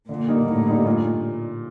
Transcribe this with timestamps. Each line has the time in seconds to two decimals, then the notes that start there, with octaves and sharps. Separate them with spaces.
0.09 A#2 D3
0.28 G3 A#3 D#4
0.47 A2 D3
0.67 G3 A#3 D#4
0.86 A#2